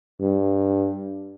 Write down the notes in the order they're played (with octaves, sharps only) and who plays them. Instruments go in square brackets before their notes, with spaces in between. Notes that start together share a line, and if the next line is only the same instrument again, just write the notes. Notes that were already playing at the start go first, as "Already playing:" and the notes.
[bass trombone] G2